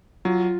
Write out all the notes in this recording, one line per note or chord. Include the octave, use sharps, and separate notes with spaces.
F#3 F4